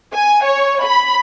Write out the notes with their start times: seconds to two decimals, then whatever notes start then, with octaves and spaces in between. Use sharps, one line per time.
0.13 G#5
0.46 C#5
0.85 B5